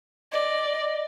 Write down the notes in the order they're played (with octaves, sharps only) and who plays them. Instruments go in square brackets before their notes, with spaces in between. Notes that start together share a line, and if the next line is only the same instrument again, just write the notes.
[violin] D5 [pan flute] D#5